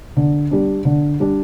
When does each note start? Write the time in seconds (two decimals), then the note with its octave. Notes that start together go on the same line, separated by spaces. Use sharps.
0.17 D3
0.51 G3 D4
0.85 D3
1.20 G3 D4